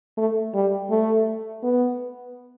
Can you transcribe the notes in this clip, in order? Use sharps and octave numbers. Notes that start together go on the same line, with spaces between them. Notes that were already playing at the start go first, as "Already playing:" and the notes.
A3
G3
A3
B3